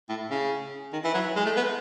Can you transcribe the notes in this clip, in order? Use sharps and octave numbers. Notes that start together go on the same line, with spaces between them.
A2
C#3
D#3
E3
F#3
G#3
A3
B3